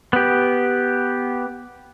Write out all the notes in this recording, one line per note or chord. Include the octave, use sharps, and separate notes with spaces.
B3 G4